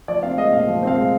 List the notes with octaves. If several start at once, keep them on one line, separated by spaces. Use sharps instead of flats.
F3 D5
C4 F5
G#3 D#5
A#2 F5
F3
C4 F5
G#3